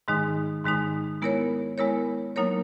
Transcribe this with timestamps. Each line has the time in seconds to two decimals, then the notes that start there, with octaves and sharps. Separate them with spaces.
0.08 G#2 D#3 G#3 D#4
0.65 G#2 D#3 G#3 D#4
1.22 G#3 B3 E4 A#4 C#5
1.78 G#3 B3 E4 A#4 C#5
2.36 F#3 A#3 D#4 A#4 C#5